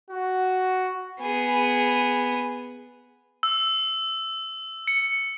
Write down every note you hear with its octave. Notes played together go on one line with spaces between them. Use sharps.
F#4
B3 G#4
E6
C#7